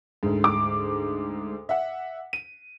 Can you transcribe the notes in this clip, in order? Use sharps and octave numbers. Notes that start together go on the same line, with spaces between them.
D2 G#2
D6
E5 F#5
D#7